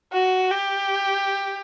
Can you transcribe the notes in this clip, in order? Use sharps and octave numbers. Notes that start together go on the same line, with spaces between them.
F#4
G4